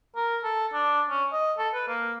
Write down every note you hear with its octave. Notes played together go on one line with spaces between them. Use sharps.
A#4
A4
D4
C#4
D#5
A4
B4
A#3